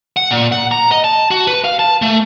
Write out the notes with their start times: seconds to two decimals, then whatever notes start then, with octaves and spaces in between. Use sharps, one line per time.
0.17 F#5
0.31 A#2
0.52 F#5
0.71 A#5
0.92 D#5
1.04 A5
1.31 F#4
1.47 B4
1.64 F5
1.79 A5
2.02 A3